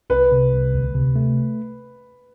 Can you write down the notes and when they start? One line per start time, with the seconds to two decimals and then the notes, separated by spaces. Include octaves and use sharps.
0.10 C2 B4
0.32 C3
0.53 C2
0.74 D2
0.95 C3
1.16 A3